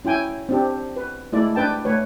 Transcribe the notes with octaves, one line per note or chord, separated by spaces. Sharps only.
C#4 E4 G5 G#5
C4 D4 G4
B4
G#3 A3 E4 D5
D4 B4 G5 A5
A3 B4 C#5